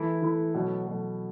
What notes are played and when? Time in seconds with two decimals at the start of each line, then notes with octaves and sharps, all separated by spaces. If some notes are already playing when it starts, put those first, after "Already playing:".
Already playing: E3 A3 E4
0.22 E3 A3 E4
0.54 B2 F#3 A3
0.86 B2 F#3 A3